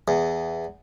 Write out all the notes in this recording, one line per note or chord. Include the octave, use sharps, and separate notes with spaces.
E2